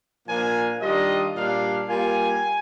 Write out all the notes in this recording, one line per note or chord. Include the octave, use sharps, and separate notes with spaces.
A#2 F3 A#3 D4 F4 G#5
D#3 G3 D4 F4 D#5
A#2 G3 D4 F5
G3 A#3 F4 G#5